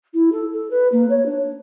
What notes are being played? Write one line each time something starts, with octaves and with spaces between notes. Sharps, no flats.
E4
A4
A4
B4
A#3
C#5
D4